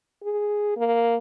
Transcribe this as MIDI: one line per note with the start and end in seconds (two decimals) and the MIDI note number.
0.23 0.76 68
0.77 1.17 58